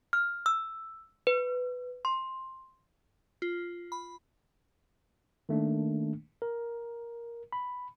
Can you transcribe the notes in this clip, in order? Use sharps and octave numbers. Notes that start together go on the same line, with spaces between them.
F6
E6
B4
C6
F4
B5
D#3 A3 A#3 D4
A#4
B5